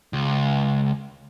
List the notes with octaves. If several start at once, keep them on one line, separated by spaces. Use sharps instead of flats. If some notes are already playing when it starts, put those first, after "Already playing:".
C#2